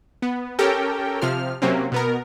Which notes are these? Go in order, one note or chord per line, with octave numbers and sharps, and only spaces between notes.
B3
C#4 G4 A4 A#4 G5
C3 F3 F6
C3 F#3 A#3 C4 C#4
B2 B3 A#4